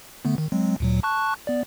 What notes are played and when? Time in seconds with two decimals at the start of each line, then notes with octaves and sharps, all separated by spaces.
0.25 D3 A3 B3
0.38 D#3
0.52 F#3 G#3 C4
0.80 D2 A#2 F#3
1.03 A5 C#6 F#6
1.47 B3 D5